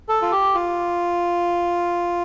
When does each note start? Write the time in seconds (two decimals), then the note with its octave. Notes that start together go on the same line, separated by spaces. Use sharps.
0.09 A4
0.22 F4
0.32 G4
0.54 F4